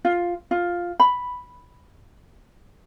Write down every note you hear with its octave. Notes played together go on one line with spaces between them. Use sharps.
F4
F4
B5